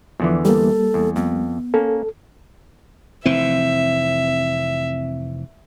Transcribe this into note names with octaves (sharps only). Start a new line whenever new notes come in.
E2 D3 E3 F3
G3 A#3 A4
E2
F2 B3
A#3 C#4 A4
F1 E3 C4 E5